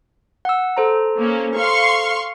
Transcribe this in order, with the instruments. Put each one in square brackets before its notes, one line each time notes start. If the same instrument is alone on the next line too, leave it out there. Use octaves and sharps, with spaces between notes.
[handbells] F#5 E6
A4 C5 A#5
[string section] A#3 C#4
F5 C6 C#6